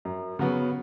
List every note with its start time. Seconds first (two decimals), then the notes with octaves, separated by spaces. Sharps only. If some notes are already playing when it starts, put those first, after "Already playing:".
0.05 F#2
0.39 C#3 F#3 B3